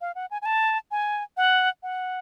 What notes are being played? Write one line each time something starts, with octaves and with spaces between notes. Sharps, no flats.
F5
F#5
G#5
G#5
A5
G#5
F#5
F#5